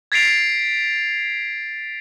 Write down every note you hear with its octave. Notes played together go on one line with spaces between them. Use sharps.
G#6 A6 B6 C7 D7 F7